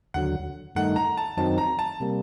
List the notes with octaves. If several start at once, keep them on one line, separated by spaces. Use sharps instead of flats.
D#2 D3 F#3 F#5
G2 D#3 A3 D#4 F#5
A#5
A5
F#2 D#3 F#3 C4 D#4 A5
A#5
A5
C3 G3 A#3